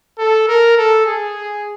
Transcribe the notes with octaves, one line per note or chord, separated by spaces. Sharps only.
A4
A#4
A4
G#4